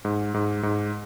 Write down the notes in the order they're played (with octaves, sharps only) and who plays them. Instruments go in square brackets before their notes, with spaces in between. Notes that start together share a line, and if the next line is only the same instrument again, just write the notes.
[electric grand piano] G#2
G#2
G#2